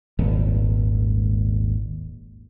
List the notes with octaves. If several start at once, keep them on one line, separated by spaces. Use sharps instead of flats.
D#1 G#1